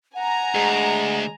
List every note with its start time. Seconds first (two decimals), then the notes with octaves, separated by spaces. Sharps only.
0.15 F#5 G#5 A#5
0.55 D2 G#3